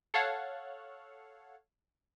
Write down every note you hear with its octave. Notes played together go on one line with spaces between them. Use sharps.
A4 C#5 F5 F#5